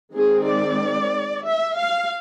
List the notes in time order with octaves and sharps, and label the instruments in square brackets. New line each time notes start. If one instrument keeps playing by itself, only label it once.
[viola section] D#3 G#3 C4 G#4
D5
E5
F5